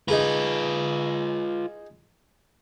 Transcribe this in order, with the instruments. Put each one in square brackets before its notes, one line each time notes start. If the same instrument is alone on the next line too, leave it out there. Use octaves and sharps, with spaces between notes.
[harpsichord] D#4 G#4 A#5 [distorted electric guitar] F4 B4